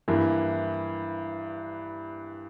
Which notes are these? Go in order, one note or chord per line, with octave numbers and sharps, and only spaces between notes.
G2 E3 A#3 E4